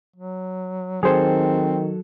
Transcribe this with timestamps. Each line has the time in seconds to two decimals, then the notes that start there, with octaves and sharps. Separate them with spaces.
0.16 F#3
1.03 D#3 F#3 C4 G#4 A4 C5